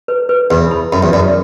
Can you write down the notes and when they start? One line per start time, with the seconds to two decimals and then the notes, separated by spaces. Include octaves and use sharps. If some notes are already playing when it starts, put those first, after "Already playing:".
0.08 B4
0.29 B4
0.51 E2 B4
0.71 B5
0.92 F#2 B5
1.03 E2
1.13 F#2 D5